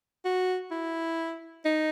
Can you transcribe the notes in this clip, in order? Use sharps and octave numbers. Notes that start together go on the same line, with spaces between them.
F#4
E4
D#4